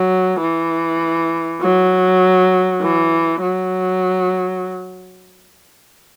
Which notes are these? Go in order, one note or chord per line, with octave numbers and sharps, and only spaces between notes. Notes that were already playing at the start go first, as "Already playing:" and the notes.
Already playing: F#3
E3
F#3
E3
F#3